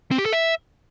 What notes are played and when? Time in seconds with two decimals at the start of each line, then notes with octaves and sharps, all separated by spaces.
0.11 C4
0.18 G4
0.25 A4
0.33 E5